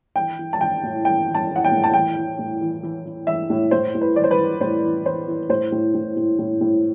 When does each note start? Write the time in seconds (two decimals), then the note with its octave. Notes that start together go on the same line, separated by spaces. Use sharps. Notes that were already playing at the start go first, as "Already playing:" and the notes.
0.16 E3 G5
0.39 E3
0.53 A5
0.61 E3 G5
0.83 A2
1.05 E3 G5
1.27 E3
1.35 A5
1.50 E3
1.56 F#5
1.65 G5
1.72 A2
1.84 A5
1.94 E3 G5
2.16 E3
2.39 A2
2.61 E3
2.83 E3
3.05 E3
3.27 E3 E5
3.50 A2
3.71 A2 C5
3.95 A2
4.01 B4
4.16 E3 D5
4.24 C5
4.31 B4
4.38 E3
4.61 A2 C5
4.84 E3
5.05 E3 C5
5.28 E3
5.49 A2 C5
5.72 A2
5.94 A2
6.17 A2
6.39 A2
6.61 A2